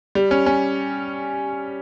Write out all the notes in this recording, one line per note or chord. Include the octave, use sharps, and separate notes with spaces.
G3
C#4
C#4